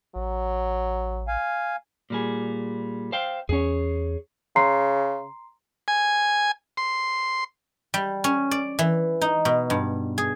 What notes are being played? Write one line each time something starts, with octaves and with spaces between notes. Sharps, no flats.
A1 F#3
F5 G#5
A#2 G3 G#4
C5 F5 G5
E2 C#4 G#4 C#5
C#3 A#5 C6 C7
G#5
C6
G3
C#4
D5
E3
D#4
B2
G2
G#4